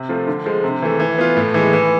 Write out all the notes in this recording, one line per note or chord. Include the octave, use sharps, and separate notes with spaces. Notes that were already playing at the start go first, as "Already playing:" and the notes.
Already playing: C3
F3 A3 C4 F4
D3
F3 G#3
C3
E3 A3
E3
B3 F4
A2
E3 G#3
E3